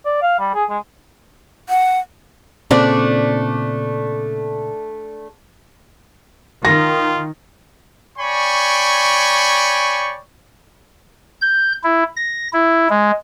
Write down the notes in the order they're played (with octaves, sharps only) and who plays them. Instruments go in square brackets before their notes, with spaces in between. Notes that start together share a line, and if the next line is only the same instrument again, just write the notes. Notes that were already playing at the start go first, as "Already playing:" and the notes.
[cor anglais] D5
F5
G3
G#4
G#3
[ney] F#5
[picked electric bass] A#2 C#3 C4 [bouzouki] A3 D4 D5
[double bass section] D#3 [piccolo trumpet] F4 [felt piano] A#6
[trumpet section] C#5 D5 G5 G#5 B5 C#6
[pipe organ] G6
E4
A#6
E4
G#3